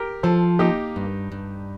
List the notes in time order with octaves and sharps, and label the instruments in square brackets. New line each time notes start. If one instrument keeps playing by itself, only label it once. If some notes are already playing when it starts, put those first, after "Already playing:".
Already playing: [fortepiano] G4 A#4
[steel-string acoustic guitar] F3 [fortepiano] A4 C5
[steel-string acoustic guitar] A#3 [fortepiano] D#4 G4
[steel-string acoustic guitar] G2
G2